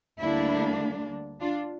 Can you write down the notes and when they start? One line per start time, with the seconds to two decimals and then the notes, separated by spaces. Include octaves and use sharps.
0.20 D2 D3 G3 A#3 D4 E4
1.40 D4 F4